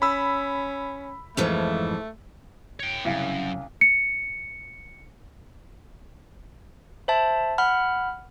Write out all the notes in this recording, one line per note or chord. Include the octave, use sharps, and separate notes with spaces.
C#4 B5 E6
F2 G#2 E3 A3
C#5 G5
C2 F#2 C#3
C#7
C5 E5 A5
F#5 B5 F6